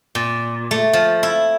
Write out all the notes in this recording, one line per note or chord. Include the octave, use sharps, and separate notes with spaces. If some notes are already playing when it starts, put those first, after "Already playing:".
A#2
A3
F3
E4